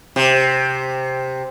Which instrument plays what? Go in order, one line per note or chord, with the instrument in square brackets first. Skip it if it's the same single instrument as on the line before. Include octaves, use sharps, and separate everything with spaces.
[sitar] C3